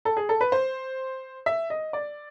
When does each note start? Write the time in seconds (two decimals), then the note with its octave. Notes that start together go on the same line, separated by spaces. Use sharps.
0.05 A4
0.17 G#4
0.29 A4
0.41 B4
0.52 C5
1.46 E5
1.70 D#5
1.93 D5